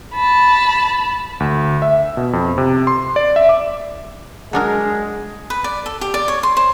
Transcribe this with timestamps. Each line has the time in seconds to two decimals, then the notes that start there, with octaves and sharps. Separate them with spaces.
0.14 A5 B5
1.40 D2
1.82 E5
2.17 B2
2.33 F2
2.58 C3
2.87 C6
3.16 D5
3.36 E5
3.49 D6
4.53 F#3 G#3 D4 A#4
5.50 B4
5.64 D5
5.86 A4
6.01 G4
6.14 D5
6.28 C#5
6.43 C6
6.57 C5